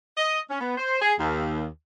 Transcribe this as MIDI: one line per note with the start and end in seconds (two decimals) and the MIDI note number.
0.17 0.38 75
0.49 0.57 61
0.60 0.73 59
0.77 0.98 72
1.01 1.13 68
1.18 1.65 39